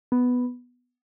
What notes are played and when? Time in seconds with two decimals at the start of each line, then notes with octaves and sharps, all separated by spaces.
0.12 B3